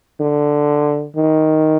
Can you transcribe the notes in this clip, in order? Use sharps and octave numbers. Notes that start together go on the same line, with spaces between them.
D3
D#3